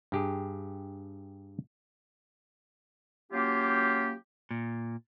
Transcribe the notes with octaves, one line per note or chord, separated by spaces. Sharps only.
G2 G4 G#4
F#3 A#3 C#4 F4 G4
A#2